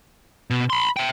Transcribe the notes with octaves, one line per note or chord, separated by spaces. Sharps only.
B2
B5 C6
E5 G5